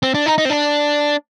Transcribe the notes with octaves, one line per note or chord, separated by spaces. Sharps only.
C4
D4
D#4
D#4
C4
D4